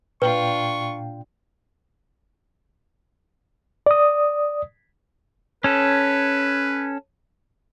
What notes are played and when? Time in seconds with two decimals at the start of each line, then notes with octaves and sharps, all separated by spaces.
0.22 A#2 D4 F4 B4 G5 C#6
3.86 D5 D#6
5.64 C#4 A4 B4